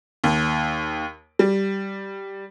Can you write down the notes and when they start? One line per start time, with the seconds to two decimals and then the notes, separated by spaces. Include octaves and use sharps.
0.24 D#2
1.39 G3